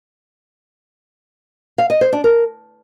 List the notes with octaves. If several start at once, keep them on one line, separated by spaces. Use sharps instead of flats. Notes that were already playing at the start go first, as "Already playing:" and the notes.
F5
D#5
C5
D4
A#4